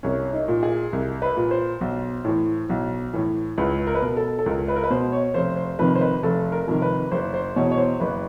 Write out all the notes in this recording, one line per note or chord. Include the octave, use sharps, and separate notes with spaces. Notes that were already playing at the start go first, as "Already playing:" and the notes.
C2 C#4
D#4
A#2
G#4
C2
B4
A#2
C5
B1
A2 E3
B1
A2 E3
C#2 B4
A#4
B4
B2 A#4
A4
A4
C#2 A#4
B4
A#4
B4
B2 C5
C#5
F1 C5
C5
F2 C3 D#3 B4
C5
B4
F1 A4
A#4
F2 C3 D#3
B4
F#1 C5
C5
E2 B2 C#5
C#5
C5
F#1 B4